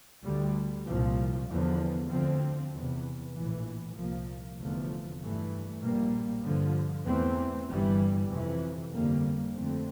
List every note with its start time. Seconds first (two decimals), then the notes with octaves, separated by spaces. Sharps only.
0.24 D2 D3 G3
0.87 C2 A#2 F3
1.48 E2 D3 F3
2.10 D2 D3 F3 C4
2.72 E2 C3 E3
3.34 A#1 A2 E3
3.95 C2 A#2 F3 A#3
4.58 F1 E2 D3 F3 A3
5.20 G2 E3 A3
5.82 A#1 A#2 G3 A#3
6.43 G2 D3 F3
7.05 E2 E3 A3 C4
7.67 G1 G2 E3 G3
8.29 F2 C3 E3
8.91 G1 F2 D3 G3 A#3
9.53 F2 D3 A3 C4